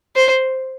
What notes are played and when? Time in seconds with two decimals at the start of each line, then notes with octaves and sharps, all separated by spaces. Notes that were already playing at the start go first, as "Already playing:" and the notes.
0.16 C5